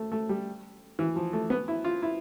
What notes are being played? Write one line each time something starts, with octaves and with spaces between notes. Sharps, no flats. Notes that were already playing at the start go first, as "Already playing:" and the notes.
Already playing: A3
A3
G3
E3
F3
A3
B3
E4
F4
E4